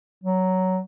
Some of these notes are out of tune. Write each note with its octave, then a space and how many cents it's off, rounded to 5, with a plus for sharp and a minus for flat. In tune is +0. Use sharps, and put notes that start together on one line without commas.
F#3 +10